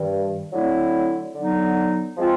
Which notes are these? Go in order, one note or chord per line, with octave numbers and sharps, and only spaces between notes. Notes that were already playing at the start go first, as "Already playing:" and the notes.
Already playing: G2 D#3 G3
D3 F#3 A3 C4 E4
D3 F#3 B3 D#4
F3 G#3 C4 F4